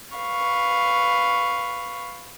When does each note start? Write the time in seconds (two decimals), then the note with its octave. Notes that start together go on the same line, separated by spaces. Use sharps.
0.16 B4 F5 C#6